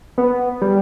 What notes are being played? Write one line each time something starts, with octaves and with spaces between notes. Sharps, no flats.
B3
G3